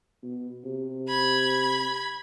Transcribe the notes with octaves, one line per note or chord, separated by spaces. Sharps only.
B2
C3
B5 G#6